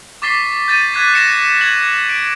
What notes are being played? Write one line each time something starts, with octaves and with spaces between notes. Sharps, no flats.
C#6 D6 A6 B6 C7 G7
G6 A6 D#7
D6 F#6 G#6 B6
A#6 C#7 E7
G#6 F#7
D7